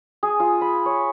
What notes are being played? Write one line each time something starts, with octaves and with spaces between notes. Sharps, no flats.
G#4
F4
B5
C#5